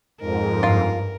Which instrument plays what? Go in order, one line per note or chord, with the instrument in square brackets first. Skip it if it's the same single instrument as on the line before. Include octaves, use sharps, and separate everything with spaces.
[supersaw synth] F2 G#2 [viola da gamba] A#4
[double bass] G2 [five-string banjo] F4 F5